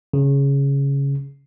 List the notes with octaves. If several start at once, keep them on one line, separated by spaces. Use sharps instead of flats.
C#3